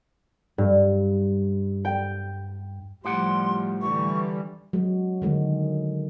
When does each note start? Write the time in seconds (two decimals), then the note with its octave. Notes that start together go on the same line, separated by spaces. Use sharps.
0.58 G2
1.85 G5
3.05 A2 F3 G3 G4 F#5 C6
3.82 D3 E3 G3 C#6
4.73 F#3 G#3
5.22 D3 D#3 G#3